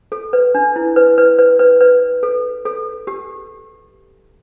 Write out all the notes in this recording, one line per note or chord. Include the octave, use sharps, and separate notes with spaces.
A4
B4
D4
E4
B4
B4
B4
B4
B4
A4
A4
G4